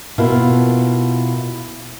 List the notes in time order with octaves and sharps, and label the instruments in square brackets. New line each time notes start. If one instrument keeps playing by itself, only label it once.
[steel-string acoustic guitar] B2 A#3 E4 F4